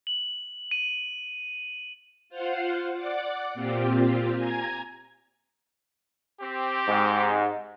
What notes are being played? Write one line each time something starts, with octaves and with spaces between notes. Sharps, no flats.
F#7
D#7
F4 C5 F5 F#5
D5 F#5 D6
A#2 C4 F4 G4
G#5 A#5 G#6
C4 G4
G#2